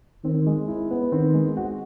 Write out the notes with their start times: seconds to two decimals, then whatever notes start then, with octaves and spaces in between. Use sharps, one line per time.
0.24 D#3 C4
0.47 G#3
0.68 E4
0.91 B3
1.12 D#3 C4
1.34 G#3
1.57 F#4